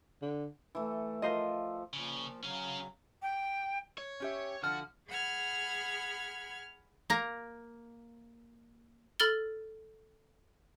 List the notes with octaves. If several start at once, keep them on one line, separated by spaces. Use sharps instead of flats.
D3
E3 A3
F3 A#4 C5 D#5
A#2 C#3 F3
C#3 F#3 C#4 F5
G5
C#5
C#4 G4 E5
D3 F3 F#4 F6
G#4 F#5 B5 F6 G#6
A#3 A#5
A4 B5 F6 A6 G7